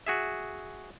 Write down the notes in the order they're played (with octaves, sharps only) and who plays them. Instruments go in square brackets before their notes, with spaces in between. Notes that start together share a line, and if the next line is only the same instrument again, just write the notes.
[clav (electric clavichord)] F#4 G#4 E5